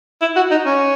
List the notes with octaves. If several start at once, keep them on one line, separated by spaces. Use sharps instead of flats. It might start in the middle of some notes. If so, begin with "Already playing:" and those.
E4
F#4
D#4
C#4